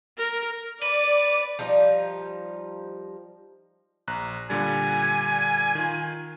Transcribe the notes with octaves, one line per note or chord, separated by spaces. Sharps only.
A#4
B4 D5
F3 G3 D#4 F4
A#1 A#5 F#6
A#2 D3 G3 G#5
D#3 F4